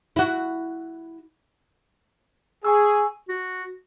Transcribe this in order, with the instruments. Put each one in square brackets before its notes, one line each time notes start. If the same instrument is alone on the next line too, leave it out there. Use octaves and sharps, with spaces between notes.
[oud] E4 F#4
[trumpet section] G#4 [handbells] G#5 C#6 E6
[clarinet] F#4